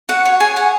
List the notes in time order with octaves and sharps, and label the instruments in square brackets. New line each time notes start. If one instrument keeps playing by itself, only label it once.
[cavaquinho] F#4 F#5
C#5
G#4 G#5
C#5 F#5